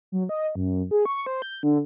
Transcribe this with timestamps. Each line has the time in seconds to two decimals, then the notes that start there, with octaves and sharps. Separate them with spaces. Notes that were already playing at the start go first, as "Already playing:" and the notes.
0.12 F#3
0.29 D#5
0.55 F#2
0.91 G#4
1.06 C#6
1.26 C5
1.42 G6
1.63 D3